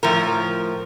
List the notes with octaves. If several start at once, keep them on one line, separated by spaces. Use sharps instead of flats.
A2 F3 A#4